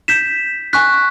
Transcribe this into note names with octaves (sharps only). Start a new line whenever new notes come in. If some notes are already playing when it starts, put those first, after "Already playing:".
G6 B6 E7
G#5 C#6 F#6 B6